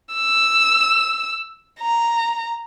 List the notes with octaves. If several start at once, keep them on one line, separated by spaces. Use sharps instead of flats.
E6
A#5